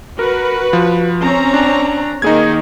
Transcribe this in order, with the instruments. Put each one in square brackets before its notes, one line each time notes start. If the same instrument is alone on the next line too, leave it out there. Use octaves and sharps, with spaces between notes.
[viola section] F#4 B4 [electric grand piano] A#4
[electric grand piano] F3
[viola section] C4 C#4 A#5
[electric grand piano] D4
[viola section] D#3 A#3 [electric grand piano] D#4 G#4 G#6